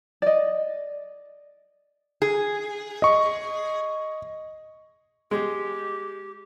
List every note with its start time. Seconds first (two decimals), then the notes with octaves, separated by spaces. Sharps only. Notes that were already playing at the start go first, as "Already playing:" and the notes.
0.22 D5 D#5
2.22 G#4
3.02 D#5 C#6
5.31 G#3 G4